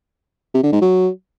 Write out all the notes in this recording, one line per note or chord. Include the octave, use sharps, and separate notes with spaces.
C3
D3
G#2
F#3